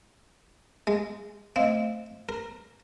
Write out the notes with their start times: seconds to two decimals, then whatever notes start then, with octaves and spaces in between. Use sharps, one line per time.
0.87 G#3
1.56 A3 C4 D#5 F5
2.29 A#4